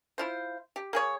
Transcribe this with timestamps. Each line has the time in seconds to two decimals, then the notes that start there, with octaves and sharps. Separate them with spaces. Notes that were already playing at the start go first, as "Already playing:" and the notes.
0.18 E4 F4 C5
0.76 G4
0.93 A#3 G#4 C#5